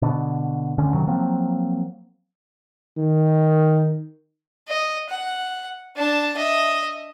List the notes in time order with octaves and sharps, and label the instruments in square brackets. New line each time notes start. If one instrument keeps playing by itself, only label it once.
[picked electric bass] B2 D3
D2 D3 C#4
G2 C3 D#3 F#3
F3 F#3 A#3 C4
[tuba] D#3
[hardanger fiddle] D#5
F#5
D4 A5
D#5 E5